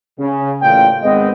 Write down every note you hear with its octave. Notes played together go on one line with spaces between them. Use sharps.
C#3
A1 A#2 F4 G5
G#1 G#3 B3 C4 D#5